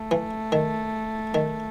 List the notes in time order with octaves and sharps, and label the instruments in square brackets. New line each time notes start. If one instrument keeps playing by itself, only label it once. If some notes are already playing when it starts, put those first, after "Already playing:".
Already playing: [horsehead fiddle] A3
[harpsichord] E3
D#3
D#3